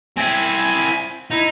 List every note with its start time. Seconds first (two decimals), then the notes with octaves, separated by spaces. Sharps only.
0.17 C4 E4 G#5
1.31 D#4 E4